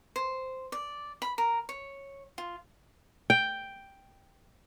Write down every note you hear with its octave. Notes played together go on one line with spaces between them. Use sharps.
C5
D5
B5
A#4
C#5
F4
G5